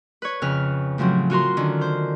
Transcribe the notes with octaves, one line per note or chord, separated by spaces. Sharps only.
B4 C#5
F2 C#3 B4 F6
A2 C#3 F3 F#3 C4
F4 F#4 A#4 C6
D3 D#3 C#4
C5